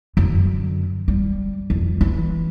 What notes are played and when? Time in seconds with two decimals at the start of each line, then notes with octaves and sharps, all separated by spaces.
0.17 F#2 D3
1.08 G3
1.70 F2
2.01 E3